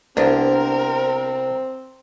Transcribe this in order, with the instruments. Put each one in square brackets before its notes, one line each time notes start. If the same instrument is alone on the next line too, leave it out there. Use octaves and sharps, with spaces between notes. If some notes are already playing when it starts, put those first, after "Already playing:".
[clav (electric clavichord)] C2 [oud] B3 D4 [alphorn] C4 [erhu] A#4